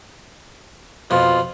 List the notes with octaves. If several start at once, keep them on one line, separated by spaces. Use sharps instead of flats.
F2 B2 F4